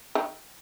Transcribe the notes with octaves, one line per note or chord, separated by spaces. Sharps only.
D#3